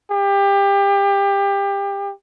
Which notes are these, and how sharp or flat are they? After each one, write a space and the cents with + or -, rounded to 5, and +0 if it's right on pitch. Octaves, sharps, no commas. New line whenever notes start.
G4 +25